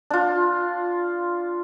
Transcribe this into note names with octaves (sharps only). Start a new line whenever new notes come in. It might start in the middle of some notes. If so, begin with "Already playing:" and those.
D4 F4